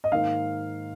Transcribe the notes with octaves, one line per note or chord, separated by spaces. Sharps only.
D#5
G#2 D#3 A#3 D#4 F5